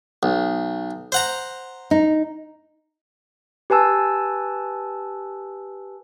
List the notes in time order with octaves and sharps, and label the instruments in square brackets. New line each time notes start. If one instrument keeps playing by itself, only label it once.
[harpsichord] B1
C5 F#5 A#5
[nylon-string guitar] D#4
[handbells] G4 B4 G#5 A5 E6